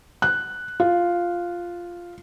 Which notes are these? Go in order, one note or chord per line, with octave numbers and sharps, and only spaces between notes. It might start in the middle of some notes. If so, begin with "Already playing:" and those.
F#6
F4